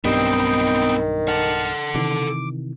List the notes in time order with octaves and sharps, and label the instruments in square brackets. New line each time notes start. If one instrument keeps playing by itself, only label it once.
[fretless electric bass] B1 G2 G3 [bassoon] D#3 [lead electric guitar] B3 C4 [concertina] D#4 G5
[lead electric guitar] A4 F#5 [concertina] A5 F6
[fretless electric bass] C3 D#3 E3 [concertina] D6